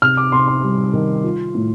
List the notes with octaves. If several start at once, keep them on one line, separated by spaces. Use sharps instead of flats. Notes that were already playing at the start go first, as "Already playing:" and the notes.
C3 F6
D6
C3 C6
C6
G3
D#3
F4
A2